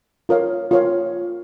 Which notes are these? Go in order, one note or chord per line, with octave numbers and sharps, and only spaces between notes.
F4 A#4 C#5 F5
F4 A#4 C#5 F5